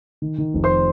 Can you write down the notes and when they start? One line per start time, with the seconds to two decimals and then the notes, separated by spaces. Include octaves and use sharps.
0.22 D#3
0.38 D#3
0.54 F1
0.64 C5 C6